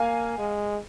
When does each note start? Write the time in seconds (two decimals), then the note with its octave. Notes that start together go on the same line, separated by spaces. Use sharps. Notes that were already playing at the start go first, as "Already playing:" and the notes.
Already playing: A#3 F5 G#5
0.38 G#3